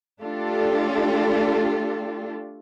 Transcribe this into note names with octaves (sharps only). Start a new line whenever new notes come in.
A3 D4 F4 G4 A4